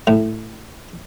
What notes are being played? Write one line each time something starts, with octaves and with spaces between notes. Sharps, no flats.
A2